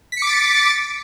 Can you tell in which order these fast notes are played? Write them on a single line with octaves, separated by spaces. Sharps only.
B6 C#7 D6 A6